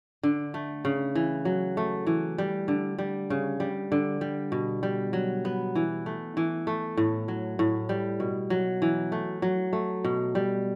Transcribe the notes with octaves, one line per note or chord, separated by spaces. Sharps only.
D3
A3
C#3
E3
F#3
A3
E3
G3
D3
G3
C#3
G3
D3
G3
B2
G3
F#3
B3
E3
A3
E3
A3
A2
F#3
A2
G3
B2
F#3
E3
A3
F#3
A3
B2
G3